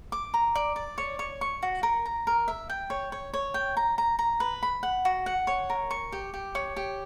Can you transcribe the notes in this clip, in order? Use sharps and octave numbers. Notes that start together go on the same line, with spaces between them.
D6
A#5
D5
D5
C#5
C#5
C#6
F#4
A#4
A#5
A#4
E5
G5
C#5
C#5
C#5
G5
A#5
A#5
A#5
B4
B5
F#5
F#4
F#5
C#5
A#4
C#6
G4
G4
C#5
G4